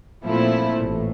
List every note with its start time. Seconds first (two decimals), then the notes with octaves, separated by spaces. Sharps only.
0.24 A#2 F3 A3 C4 E4
0.82 A1 A2